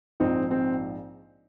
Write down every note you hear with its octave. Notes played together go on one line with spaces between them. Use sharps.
A#1 G#2 F3 C4 D#4
C4